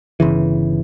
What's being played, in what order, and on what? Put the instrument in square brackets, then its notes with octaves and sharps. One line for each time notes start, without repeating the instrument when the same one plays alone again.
[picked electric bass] G1 C#3 E3